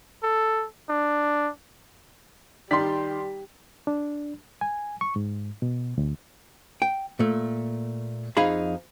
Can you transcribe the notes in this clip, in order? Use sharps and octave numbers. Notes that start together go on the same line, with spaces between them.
A4
D4
D#3 G3 G4 D5 C6 B6
D4
G#5
C#6
G#2
B2
D2
G5
A#2 A3
F2 D#4 G#4 F5 B5